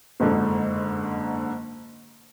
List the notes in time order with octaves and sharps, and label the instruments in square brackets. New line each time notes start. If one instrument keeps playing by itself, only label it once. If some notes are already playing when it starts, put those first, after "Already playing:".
[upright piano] F#1 F2 G#2 D3